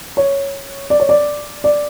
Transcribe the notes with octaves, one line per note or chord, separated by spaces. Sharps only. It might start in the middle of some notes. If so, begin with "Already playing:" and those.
C#5
D5
C#5
D5
D5